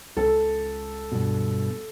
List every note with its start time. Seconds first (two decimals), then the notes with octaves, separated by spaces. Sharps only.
0.17 C#2 A4
1.12 G2 B2